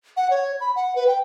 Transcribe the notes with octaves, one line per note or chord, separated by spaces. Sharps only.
F#5
C#5
B5
F#5
B4
G5